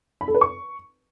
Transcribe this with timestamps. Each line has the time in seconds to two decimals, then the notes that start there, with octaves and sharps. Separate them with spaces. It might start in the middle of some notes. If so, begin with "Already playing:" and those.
0.21 B5
0.28 A4
0.35 B4
0.41 C#6